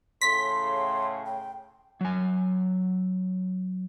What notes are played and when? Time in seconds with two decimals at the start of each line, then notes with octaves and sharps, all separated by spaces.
0.21 A2 C#3 C6 B6
1.26 G5
2.01 F#3 G#5